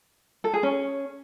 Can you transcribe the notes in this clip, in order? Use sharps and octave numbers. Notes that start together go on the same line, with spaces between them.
A4
G#4
C#4